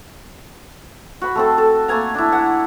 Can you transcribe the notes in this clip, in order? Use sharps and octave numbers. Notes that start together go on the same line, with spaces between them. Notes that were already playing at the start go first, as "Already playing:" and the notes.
F#4 B5
A3 C4 A4
A4
A3 A#3 G#5 A#5
D4 E4
F#5